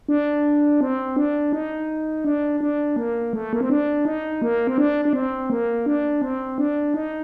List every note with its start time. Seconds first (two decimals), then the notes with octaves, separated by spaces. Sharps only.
0.09 D4
0.81 C4
1.16 D4
1.53 D#4
2.25 D4
2.61 D4
2.96 A#3
3.33 A3
3.53 A#3
3.61 C4
3.70 D4
4.05 D#4
4.42 A#3
4.67 C4
4.78 D4
5.05 D4
5.13 C4
5.50 A#3
5.86 D4
6.22 C4
6.58 D4
6.94 D#4